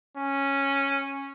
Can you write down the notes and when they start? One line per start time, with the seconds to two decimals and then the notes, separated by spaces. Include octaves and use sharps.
0.17 C#4